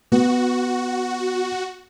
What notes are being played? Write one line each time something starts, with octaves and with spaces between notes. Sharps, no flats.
B3 F#4